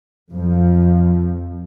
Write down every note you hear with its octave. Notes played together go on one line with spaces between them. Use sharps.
F2 F3